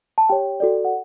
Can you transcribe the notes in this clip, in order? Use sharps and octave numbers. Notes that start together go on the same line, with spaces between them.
A5
G4 C#5 G5
F#4 A4 D5
F#5